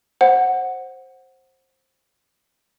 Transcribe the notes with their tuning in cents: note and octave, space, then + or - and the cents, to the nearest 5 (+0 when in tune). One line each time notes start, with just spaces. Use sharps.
C5 +15 F#5 +0